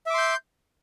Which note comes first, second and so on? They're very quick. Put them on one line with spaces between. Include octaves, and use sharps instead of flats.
E5 D6 C6 G6